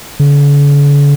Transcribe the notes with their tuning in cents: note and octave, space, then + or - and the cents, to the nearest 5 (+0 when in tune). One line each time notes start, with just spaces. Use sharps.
D3 -45